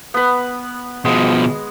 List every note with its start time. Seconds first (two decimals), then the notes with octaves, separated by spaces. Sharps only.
0.14 B3 B4
1.05 B2 F3 G#3